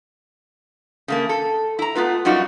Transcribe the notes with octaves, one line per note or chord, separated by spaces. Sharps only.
C#3 A3 A#3
A4
E4 A#5
A3 B3 F4 B4
F#2 G3 D#4 F4 F#4